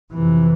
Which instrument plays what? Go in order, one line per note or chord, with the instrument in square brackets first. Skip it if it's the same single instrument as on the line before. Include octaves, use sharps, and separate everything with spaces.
[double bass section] F2 C3 E3